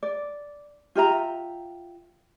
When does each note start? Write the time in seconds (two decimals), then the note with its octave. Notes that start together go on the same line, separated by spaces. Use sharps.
0.03 D5
0.95 F4 G4 E5 A#5